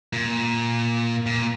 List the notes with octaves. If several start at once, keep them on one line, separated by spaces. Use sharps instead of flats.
A#2
A#2